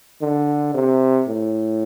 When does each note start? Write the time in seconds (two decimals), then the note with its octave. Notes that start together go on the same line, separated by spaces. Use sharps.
0.21 D3
0.74 C3
1.28 A2